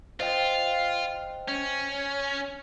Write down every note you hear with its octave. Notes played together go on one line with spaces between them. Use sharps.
F4 C5 D#5 G5
C#4